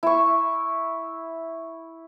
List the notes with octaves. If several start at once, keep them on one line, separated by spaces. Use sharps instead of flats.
E4 C#6